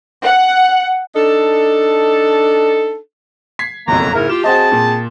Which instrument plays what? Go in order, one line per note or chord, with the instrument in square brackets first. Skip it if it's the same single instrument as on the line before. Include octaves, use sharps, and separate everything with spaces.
[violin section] F#5
[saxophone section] D4 D#4 A4
[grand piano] G#6 B6 C7
[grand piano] F#1 B1 F2 [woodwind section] F#3 A#3 A#5
[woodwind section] G#2 C#3 A#4 [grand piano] E4
[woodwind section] F4 G4 [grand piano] E7
[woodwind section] C4 G#4 A5 [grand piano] F#4 C5 D#5
[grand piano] A#2